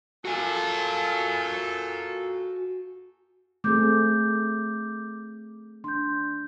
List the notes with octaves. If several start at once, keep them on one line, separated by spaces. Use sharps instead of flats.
A#2 F4 F#4 A4 G#5
A3 C4 G#4 D6 G6
D4 C6 G6